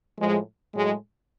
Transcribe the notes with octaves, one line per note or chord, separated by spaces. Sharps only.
A2 F3 G#3
A2 F#3 G#3